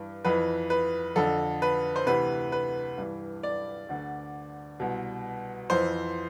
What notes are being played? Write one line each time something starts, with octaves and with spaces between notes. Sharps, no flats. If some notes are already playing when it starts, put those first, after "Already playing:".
Already playing: G2 E3
F2 E3 B4
B4
F2 D3 A4
B4
C5
D2 C3 E3 B4
B4
G2 E3
D5
D2 D3
C2 B2
F2 E3 C5